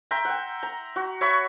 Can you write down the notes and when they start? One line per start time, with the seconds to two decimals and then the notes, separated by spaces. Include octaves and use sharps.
0.11 E5 G5 A#5 C6
0.25 F#5 G5
0.63 A#5
0.96 F#4
1.21 C#5 E5 B5 C#6